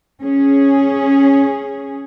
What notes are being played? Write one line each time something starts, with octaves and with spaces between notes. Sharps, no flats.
C#4 G#4